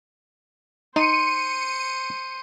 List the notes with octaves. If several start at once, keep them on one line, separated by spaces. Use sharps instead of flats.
D#4 C5 C6 C#7 D#7